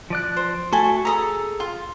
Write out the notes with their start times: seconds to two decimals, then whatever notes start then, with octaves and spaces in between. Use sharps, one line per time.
0.10 F3 D5 F#6
0.37 C5
0.73 A3 F#4 A4 G#5
1.05 G#4 A4 A#5 B5 D#6
1.60 F4